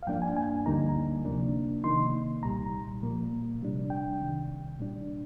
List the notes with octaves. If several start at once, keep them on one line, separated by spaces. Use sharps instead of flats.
F5
G2 F3 A#3 D4 G5
G#5
G#5
D2 D3 G3 A#3 D#4 A#5
C3 F3 A#3 D4
C3 D#3 A#3 D#4 C6
C2 A#2 G3 A#5
A#2 F3 A#3
C3 G3 D4
G5
C2 C3 D#3
A#2 G3 D4